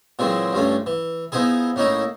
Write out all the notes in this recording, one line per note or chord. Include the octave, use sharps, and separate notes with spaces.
A#2 E3 F#3 G#3 C4
G2 F3 A3 C#4
E3
F3 B3 D#4 E4 G#4
A2 A#3 C#4 D#4 E4